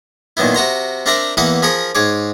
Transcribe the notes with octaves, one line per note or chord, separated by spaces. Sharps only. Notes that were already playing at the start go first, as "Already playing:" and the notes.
A#2 D#3 F#3 B3 E4
C3 F#4 A#5 C6
C4 D4 A#4 D5 E5 A#5
E2 E3 A#3 B4 F#5 D#6
F3 G#4 A#4 B5 C#6 D#6
G#2 G#4 C#5 D6